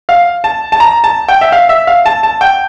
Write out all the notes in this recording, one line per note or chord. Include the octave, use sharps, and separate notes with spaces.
F5
A5
A5
A#5
A5
G5
E5
F5
E5
F5
A5
A5
G5